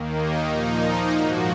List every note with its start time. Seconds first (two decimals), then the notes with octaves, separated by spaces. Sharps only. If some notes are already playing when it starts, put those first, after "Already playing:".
Already playing: D#2 D#3 A#3
0.15 D#4
0.47 A#2 F3 A#3 D#4
1.14 G#2 F3 A#3 F#4